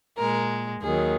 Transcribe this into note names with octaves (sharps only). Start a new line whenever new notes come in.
A#2 G#3 A#4
D#2 D#3 F#3 G#4